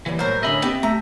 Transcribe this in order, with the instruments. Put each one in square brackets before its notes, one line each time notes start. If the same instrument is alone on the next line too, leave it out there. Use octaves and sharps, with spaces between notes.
[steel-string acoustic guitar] A#2 F#3 G3 [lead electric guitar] E3
[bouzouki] A2 A#4 [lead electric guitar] C5
[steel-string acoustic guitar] D3 C#4 G#5 [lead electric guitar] D#5 B5 [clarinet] E5
[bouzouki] B3 [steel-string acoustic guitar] C4 G4 A5
[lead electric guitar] A3 [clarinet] E5 [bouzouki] A#5